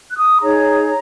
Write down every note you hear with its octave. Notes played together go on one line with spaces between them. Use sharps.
F#6
D#6
D#4 G#4 C#5 A#5